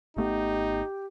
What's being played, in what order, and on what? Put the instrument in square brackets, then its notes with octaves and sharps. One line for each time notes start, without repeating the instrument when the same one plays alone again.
[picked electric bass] G#1 A3 B3 [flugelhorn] D#4 [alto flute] G4